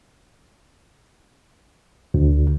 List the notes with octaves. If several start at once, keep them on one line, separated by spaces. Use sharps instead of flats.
D2